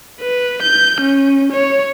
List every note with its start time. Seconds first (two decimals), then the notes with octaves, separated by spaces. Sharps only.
0.21 B4
0.63 G6
1.01 C#4
1.52 C#5